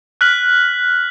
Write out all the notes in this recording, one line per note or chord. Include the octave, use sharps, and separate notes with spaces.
F6 F#6 B6 F#7